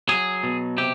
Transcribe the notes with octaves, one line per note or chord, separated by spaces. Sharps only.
F#3 G#4
B2
C3 G4